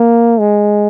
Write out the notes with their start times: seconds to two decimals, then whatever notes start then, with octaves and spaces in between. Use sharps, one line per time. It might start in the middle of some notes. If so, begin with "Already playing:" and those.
Already playing: A#3
0.40 G#3